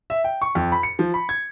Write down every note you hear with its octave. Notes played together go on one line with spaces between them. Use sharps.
E5
G5
C#6
F2
B5
C#7
F3
B5
G#6